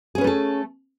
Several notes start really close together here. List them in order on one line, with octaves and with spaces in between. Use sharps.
G#4 C#4 B4 A3 A4